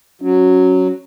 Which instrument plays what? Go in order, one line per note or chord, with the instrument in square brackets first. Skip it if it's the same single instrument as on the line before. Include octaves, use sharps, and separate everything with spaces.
[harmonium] F#3 [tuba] C#4